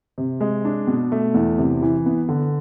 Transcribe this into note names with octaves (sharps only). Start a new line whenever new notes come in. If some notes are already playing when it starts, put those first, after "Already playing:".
C3
G#3
D4
B2
A3
E2
C3
E3
B3
D3